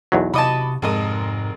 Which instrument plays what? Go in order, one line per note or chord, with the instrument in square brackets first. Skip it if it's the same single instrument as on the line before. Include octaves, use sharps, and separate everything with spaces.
[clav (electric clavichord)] B1 E2 F#3
[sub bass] C3 [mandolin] F#4 D#5 A5 [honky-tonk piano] B5 D6 D#6
[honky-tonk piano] F1 G#3 A#4 [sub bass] G#2 [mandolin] A4 D#5 D#6